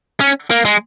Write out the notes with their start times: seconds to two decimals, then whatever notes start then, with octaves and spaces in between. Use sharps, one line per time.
0.20 C#4
0.50 A#3
0.65 G#3